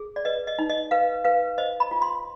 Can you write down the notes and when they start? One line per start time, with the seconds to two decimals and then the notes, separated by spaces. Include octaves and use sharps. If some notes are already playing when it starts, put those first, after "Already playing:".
Already playing: G#4
0.16 D5
0.25 B4 D#5
0.47 D#5
0.59 D#4
0.70 D#5
0.91 B4 F5
1.24 B4 F5
1.58 C5 D#5
1.80 B5
1.91 F4
2.02 C6